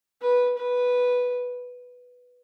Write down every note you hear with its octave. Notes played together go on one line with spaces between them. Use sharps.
B4
B4